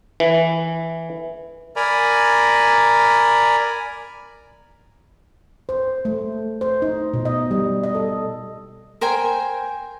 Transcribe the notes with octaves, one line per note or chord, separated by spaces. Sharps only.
E3
A#4 D5 G#5 A#5 B5
C5
A3
C5
D#4
B2
D#5
G3
D#5
A4
A#4 C5 G5 G#5